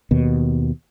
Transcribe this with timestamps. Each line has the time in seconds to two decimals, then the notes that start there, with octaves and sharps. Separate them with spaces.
0.11 D#2 B2